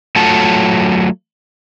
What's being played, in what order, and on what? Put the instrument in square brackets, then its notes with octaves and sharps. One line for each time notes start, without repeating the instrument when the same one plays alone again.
[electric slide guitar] F#3 A3 F4 A4 F#5 A5